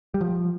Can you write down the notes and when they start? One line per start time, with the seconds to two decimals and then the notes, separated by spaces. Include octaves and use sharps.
0.14 G3
0.21 F3